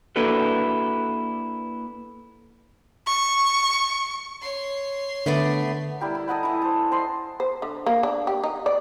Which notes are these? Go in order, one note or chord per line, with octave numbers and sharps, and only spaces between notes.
A#3 D4 E4 F#4 A4 B4
C#6
C#5 C6
D3 A3 B3 D5
G3 E4 G4 A#4
E4
A4 D#5 F#5 B5
E3 E4
A4 C5
C5 D#5 A5 C6
C5
D3
A#3
D4
G4
D#4
D5